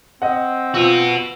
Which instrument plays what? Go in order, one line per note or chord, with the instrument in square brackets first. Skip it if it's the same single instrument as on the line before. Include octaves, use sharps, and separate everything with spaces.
[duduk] C4 [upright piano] D#5 F#5
[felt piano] F3 F4 E6 [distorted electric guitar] F#4 B4